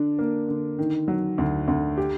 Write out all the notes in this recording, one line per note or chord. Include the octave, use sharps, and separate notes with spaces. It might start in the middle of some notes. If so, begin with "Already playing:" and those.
Already playing: D3 D4
A#3
D3
D#3
F#3
D2
D2
G4